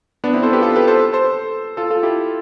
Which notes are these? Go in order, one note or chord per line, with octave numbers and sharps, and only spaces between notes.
B3 D4
C4 E4
A4 C5
G4 B4
F4 A4
G4 B4
A4 C5
A4 C5
F4 A4
F4 A4
E4 G4